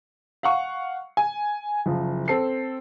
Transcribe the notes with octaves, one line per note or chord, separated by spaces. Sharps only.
F5 F#5 C#6
G#5
F#1 F3
C4 A4 C7